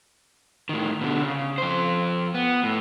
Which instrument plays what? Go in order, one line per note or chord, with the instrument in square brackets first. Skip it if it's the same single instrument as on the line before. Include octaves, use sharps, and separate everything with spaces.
[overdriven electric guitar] A2 D#3
B2 D3
C#3
F2 C5
B3
A2